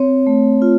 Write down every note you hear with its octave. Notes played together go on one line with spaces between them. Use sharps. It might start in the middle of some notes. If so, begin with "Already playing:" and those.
Already playing: C4 C#5
A3
F4